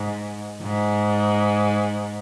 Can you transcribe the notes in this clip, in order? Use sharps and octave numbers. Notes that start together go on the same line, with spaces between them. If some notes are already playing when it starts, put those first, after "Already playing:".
Already playing: G#2
G#2